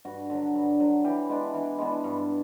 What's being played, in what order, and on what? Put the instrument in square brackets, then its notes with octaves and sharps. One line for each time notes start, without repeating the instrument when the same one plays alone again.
[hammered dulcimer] G2 F#4
D3 F#3
G2
D3 F#3
E3 G4
G#3 B3 D4
E3
G#3 B3 D4
G2